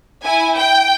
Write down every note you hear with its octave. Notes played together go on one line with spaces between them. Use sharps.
E4 G#5
G5